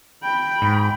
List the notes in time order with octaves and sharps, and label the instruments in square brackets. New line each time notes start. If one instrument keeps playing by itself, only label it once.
[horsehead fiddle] G5 B5
[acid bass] G#2